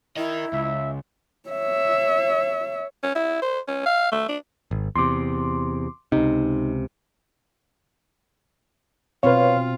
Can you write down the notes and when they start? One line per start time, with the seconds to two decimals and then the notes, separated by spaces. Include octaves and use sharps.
0.17 E4 A#4 D#5
0.53 C#2 E5
1.49 C#5 E5
3.03 C#4
3.15 E4
3.42 C5
3.68 C#4
3.86 F5
4.12 A3
4.29 D4
4.71 G#1
4.96 E2 C3 C6 D6
6.12 C#2 C3 D#4
9.23 B2 C4 F4 B4 C#5 F5